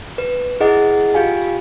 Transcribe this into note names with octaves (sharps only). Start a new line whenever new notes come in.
B4
E4 G#4 D#5 F#5
F4 G4 F5 G#5